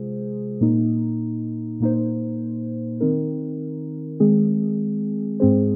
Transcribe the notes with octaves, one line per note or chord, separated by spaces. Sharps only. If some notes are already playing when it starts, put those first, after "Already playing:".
Already playing: C3 G#3 F4 G#4 C5
A#2 A#3 D#4
A#2 A#3 D#4 C5
D#3 C4 D#4 A#4
D#3 G#3 C4 G#4
G#2 G#3 C4 G#4 C5